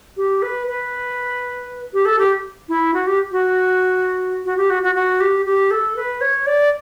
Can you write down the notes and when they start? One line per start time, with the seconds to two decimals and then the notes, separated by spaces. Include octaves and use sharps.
0.17 G4
0.42 B4
0.68 B4
1.93 G4
2.05 A4
2.19 G4
2.69 E4
2.94 F#4
3.07 G4
3.32 F#4
4.45 F#4
4.57 G4
4.70 F#4
4.83 F#4
4.95 F#4
5.20 G4
5.46 G4
5.71 A4
5.96 B4
6.21 C#5
6.46 D5